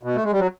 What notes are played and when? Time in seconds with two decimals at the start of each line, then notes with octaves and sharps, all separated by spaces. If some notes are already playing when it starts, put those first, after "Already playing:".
0.03 B2
0.16 A3
0.24 G#3
0.32 G3
0.39 F#3